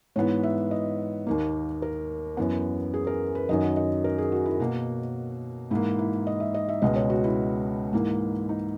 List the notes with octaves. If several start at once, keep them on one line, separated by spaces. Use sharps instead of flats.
G#2 E3 B3 C#5
E5
D#5
D#2 D#3 A#3
A#4
F#2 E3 B3
G#4
A#4
B4
F#2 D#3 F#3 D#5
D#5
A#4
G#4
F#4
E4
B2 A#3 F#4
G#2 E3 A#3 E4
E4
D#5
E5
D#5
E5
C#2 B2 G#3 B3 D#5
C#5
F#4
E4
G#2 E3 A#3
D#4